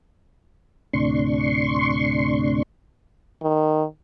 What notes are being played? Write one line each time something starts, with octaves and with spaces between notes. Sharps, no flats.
D2 A2 C3 D4 C6 C#6
D#3